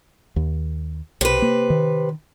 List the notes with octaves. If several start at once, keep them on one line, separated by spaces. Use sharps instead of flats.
D#2
B1 C3 B4
A#3
D#3